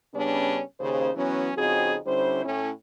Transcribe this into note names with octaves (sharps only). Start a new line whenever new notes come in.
C#3 G3 B3 C#4 D4
D#2 C#3 C5
E3 F#3 B3 C#4
F2 C#3 C4 D#4 F#4 G#4
D3 G3 C#4 E4 C5
A2 C#4